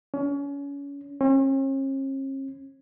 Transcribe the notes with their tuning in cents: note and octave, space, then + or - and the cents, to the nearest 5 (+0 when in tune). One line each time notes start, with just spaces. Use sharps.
C#4 +30
C#4 -45